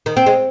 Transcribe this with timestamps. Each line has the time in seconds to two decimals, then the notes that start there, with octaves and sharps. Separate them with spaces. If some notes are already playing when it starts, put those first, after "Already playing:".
0.06 D#3
0.17 C4
0.26 G#3